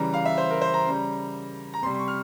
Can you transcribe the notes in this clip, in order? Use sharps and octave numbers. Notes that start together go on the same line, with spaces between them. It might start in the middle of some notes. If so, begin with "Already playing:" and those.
Already playing: C#3 E3 G3 A#5
F5
E5
C5
A#4
C5
A#5
C#3 G3
A#5
C3 G3 C6
C6
C#6
F6